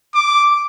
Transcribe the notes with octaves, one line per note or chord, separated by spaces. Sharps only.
D6